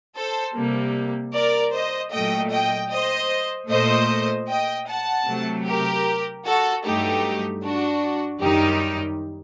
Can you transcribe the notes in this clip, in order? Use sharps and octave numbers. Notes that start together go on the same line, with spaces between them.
A4 C5
C3 G3 A#3
A#4 D5
C5 D#5
A#2 F#3 A3 D#5 G5
D#5 G5
C5 D#5
A#2 A3 C5 D#5
D#5 G5
F#5 A5
C3 F#3 A3
G4 A#4
F#4 A4
G2 F#3 A3 D#4 G4
D4 F#4
F#2 D#3 G3 D#4 G4